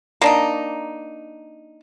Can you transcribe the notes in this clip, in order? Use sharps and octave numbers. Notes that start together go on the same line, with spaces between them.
A#3 D4 D#4